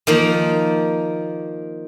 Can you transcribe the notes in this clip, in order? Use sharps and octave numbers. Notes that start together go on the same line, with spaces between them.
D#3 F3 A#3